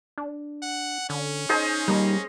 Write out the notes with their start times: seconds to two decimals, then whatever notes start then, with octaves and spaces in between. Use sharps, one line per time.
0.18 D4
0.62 F#5
1.10 D3 C#4
1.49 D#4 G#4 C5 D#5
1.88 G3 A#3 D#4